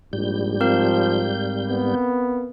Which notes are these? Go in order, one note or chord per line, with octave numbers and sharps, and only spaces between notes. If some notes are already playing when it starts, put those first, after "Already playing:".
A#1 G#2 G3 G6
F3 C4 A#4 F5
B3